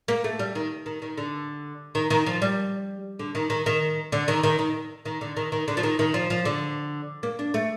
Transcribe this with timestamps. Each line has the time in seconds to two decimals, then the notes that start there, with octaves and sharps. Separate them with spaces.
0.08 A#3
0.24 A3
0.39 G3
0.55 D#3
0.86 D#3
1.02 D#3
1.17 D3
1.95 D#3
2.10 D#3
2.26 F3
2.42 G3
3.19 D3
3.35 D#3
3.50 D#3
3.66 D#3
4.12 D3
4.28 D#3
4.43 D#3
4.59 D#3
5.05 D#3
5.21 D3
5.37 D#3
5.52 D#3
5.68 D3
5.77 F3
5.83 D#3
5.99 D#3
6.14 F3
6.30 F3
6.45 D3
7.23 A#3
7.39 D4
7.54 A3